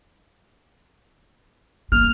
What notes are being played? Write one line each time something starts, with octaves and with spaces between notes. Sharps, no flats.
A#3 F6